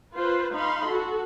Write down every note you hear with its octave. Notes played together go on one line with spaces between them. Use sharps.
F4 B4 C5
D#4 F5 B5 C6
F#4 A4